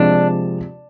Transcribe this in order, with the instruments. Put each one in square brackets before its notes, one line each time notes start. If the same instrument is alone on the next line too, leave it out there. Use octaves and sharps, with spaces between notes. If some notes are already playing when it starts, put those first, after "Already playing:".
Already playing: [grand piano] C3 F3 G#3 [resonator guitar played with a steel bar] D4